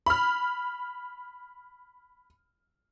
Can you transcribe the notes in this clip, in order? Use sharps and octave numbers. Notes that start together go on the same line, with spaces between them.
B5 F6